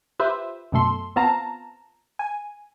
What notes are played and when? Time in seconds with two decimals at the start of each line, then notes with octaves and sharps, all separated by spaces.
0.19 F4 G4 B4 C5 E5
0.72 F#2 B2 A3 A4 C6
1.16 B3 C4 F4 F5 A5 A#5
2.19 G#5